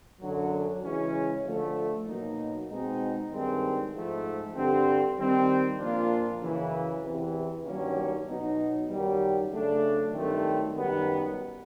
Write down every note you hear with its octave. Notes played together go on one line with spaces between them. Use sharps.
F#2 D3 F#3
C#3 E3 G#3 C#4
D3 F3 A3
B2 F#3 A#3 D#4
B2 G#3 C4 D#4
G2 D#3 G#3 C4
G#2 F3 A3
G2 D3 G3 C4
D#3 G3 C4
A#2 F3 A#3 D4 F4
F#2 C#3 E3
E2 C3 E3
G2 D#3 F#3 A#3 C#4
B2 F#3 B3 D#4
F#2 D#3 G3
C#3 F#3 A3 D4
G2 D#3 F#3 A3 C4
F#2 D#3 G3 B3